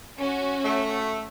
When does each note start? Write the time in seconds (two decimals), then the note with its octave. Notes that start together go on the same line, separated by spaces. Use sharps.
0.19 C#4 F#4
0.64 A3